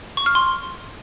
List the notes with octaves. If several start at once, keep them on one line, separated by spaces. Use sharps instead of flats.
C#6
F6
C6